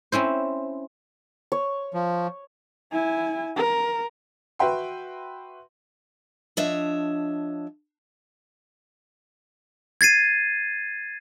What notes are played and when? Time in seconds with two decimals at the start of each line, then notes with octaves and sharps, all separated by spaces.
0.12 C4 C#4 E4 C5
1.52 C#5
1.94 F3
2.92 E4 G#5
3.56 A#4
4.59 F#4 B4 E5 G5 C6
6.57 F3 D4 C#5 D#5 E5
10.01 G#6 A6 C7 D#7